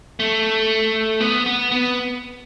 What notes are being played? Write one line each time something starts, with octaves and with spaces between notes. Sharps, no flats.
A3
B3
B3
B3